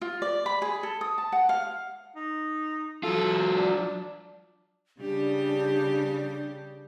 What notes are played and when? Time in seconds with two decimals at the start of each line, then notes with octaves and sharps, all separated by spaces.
0.02 F4
0.22 D5
0.46 B5
0.62 G#4
0.83 A4
1.01 D#6
1.18 A5
1.32 F#5
1.49 F5
2.16 D#4
3.03 F#3 F4 A4
3.55 D4
5.00 C#3 G3 D4 G4